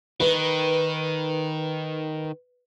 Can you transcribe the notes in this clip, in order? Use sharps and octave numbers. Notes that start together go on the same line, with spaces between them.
D#3 B4